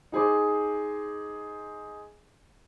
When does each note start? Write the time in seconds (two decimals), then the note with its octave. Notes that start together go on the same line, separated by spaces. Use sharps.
0.12 D#4 G#4 C5 D6